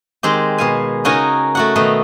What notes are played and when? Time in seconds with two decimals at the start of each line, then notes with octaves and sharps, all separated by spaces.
0.23 D#3 G#3 C4 G4
0.58 B2 F5 G#5
1.05 C#3 D#4 F#4 A#4 C#5 G#5
1.55 A3 F#4 F#5
1.76 B2 D#3 A3 D#4